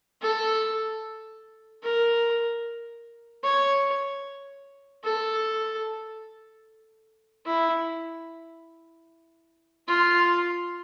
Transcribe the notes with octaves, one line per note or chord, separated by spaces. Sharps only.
A4
A#4
C#5
A4
E4
F4